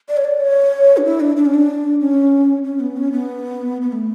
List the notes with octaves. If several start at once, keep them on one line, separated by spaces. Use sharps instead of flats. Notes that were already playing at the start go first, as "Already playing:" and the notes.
D5
C#5
D5
C#5
D4
E4
D4
D4
C#4
D4
C#4
C#4
B3
C#4
B3
B3
A3